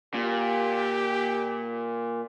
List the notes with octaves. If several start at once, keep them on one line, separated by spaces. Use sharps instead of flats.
A#2 G4